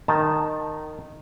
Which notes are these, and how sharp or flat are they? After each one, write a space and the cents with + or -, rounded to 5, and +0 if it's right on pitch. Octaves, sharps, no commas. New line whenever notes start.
D#3 -15 A5 +0